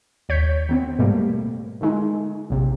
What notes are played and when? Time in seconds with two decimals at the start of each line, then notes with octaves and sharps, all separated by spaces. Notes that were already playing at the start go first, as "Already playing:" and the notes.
0.29 D#2 C#5 G6 B6
0.69 D#3 B3 C4
0.99 G#2 B2 G3 A3 A#3
1.81 D3 D#3 G#3 D#4
2.50 A#1 C3